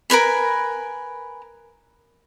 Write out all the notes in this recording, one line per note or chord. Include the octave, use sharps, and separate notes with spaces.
A#4 B4 G#5 B5